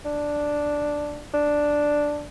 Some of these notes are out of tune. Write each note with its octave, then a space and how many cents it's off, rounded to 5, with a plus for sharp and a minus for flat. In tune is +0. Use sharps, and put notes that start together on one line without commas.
D4 +0
D4 +0